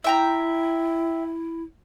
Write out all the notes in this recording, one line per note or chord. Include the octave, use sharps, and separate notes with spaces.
E4 E5 G5 A#5